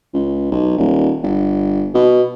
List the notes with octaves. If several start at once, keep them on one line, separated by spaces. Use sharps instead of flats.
C#2
B1
D#1
G1
B2